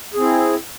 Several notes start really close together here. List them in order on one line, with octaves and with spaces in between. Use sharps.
G#4 C4 E4